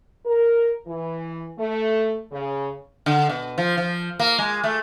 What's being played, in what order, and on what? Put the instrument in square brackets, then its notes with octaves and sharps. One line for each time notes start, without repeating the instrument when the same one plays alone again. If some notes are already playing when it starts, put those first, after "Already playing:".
[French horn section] A#4
E3
A3
C#3
[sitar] D3
B2
F3
F3
A#3
G#3
A3